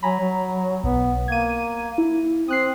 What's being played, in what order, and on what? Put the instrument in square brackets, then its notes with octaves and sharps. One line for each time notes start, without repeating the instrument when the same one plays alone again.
[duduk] F#3 [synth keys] G#5 A#5 B5
[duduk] F#3
[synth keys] B1 [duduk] B3
[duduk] A#3 [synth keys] G#6 D#7
[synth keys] E4
[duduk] C4 [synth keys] D#6 F#6 C7